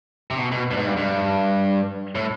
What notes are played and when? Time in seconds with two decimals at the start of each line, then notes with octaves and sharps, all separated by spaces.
0.30 C3
0.38 B2
0.52 B2
0.71 G2
0.77 G#2
0.86 G2
0.97 G2
2.15 A2